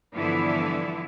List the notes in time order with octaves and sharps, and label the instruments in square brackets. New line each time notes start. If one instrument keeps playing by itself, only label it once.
[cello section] G2 D3 E3 F3 B3 E4